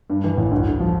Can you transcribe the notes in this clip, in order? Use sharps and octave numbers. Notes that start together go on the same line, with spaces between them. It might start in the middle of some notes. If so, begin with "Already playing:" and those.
G2
E3
A1
D2
D3
F3